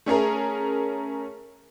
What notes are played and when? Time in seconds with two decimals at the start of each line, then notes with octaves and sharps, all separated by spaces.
0.06 A3 C#4 G#4 A#4